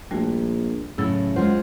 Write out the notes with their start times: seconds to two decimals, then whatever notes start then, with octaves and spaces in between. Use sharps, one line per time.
0.11 A#1 G3 A3 F#4
0.98 A2 C#3 F#3 E6
1.36 G#3 F4 C5 F#5